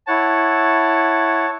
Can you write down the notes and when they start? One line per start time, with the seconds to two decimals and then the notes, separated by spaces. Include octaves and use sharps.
0.07 E4 C#5 F#5 A5